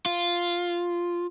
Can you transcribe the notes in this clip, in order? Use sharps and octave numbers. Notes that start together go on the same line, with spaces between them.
F4